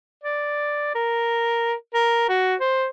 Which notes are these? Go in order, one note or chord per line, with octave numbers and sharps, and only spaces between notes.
D5
A#4
A#4
F#4
C5